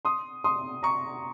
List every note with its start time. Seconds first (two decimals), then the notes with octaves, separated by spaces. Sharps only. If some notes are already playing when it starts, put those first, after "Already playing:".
0.05 C6 D#6
0.44 C6 D#6
0.83 A#5 C#6